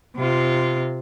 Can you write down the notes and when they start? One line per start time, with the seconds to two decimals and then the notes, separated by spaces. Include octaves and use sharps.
0.16 C3 F4